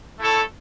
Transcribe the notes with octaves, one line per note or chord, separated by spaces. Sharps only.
A3 E4 A4 C#5